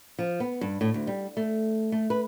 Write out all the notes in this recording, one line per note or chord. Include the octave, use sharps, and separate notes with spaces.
F3
B3
G2
A2
D2
G3
A3
A3
B4